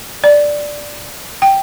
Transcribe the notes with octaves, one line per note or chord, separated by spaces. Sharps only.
D5
G5